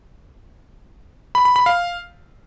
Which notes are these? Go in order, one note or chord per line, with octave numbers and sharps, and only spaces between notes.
B5
B5
B5
F5